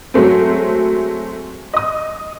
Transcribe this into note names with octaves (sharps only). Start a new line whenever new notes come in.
F#3 G#3 A3 C4
D#5 D#6